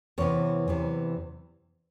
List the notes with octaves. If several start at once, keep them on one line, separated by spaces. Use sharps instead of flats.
E2 C3 E3 C#5
E2 C3 E3